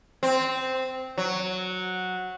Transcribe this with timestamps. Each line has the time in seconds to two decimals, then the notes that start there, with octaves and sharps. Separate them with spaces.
0.23 C4
1.18 F#3